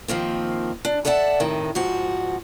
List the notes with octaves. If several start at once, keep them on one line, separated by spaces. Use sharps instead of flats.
D#3 F3 A#3 C4
D4
A4 D5 E5 F#5 A5
A2 C3 D#3
G#2 F3 F#4